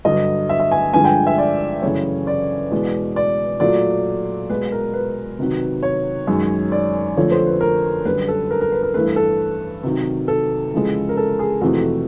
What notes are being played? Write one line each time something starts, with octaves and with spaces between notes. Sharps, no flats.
G2 D3 F#3 D#5
E5
E5
G#5
G2 D3 F3 G#3 G#5
G5
E5
D5
F#2 C#3 E3 A3 C#5
D5
E2 B2 G#3
D5
A#2 F#3 A3 D5
B2 G#3 B4
A#4
B4
C3 D#3 F#3
C#5
F#2 D#3 G#3
D5
F2 D3 F3 A3 C#5
C5
B4
A#4
F#2 D3 G3 B4
A4
A#4
A#4
B4
A#4
G2 E3 A3 B4
A4
C3 D#3 F#3
A4
E2 C#3 F3 G#3
A#4
A4
G#4
F2 C3 E3 A3 F#4